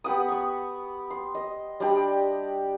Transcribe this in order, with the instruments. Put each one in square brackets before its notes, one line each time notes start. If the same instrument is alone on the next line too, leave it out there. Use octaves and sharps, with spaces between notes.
[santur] B3 G4 F#5 D#6
C#6 D#6
C6
D#5
G3 D4 G4 D#5